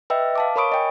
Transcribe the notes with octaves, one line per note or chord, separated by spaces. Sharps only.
B4 D#5 E5 G5 E6
F5 A5 D6
A#4 C#5 B5 C#6 D#6 D7
D#5 G5 G#5